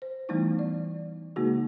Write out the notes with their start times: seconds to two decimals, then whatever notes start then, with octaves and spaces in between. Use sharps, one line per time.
0.02 C5
0.29 E3 G3 A3 B3 D#4 E4
0.59 D5
1.36 C#3 G#3 A#3 D#4 F#4 G#4